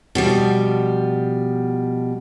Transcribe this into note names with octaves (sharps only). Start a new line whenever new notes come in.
B2 F3 G3